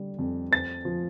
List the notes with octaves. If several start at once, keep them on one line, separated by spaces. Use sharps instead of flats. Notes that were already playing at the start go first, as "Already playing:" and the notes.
Already playing: D3 G3
F2
C4 A6
F3